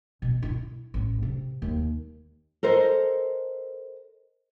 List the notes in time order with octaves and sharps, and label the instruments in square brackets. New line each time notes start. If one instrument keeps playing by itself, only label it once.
[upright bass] B2
E4
A1
C3
D#2
[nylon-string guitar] A4 A#4 C5 D#5